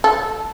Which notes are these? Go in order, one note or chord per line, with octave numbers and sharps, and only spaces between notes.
A4